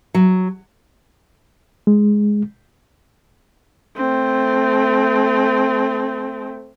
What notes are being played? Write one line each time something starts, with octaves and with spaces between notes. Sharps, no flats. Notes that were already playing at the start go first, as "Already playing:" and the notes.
F#3
G#3
A3 C4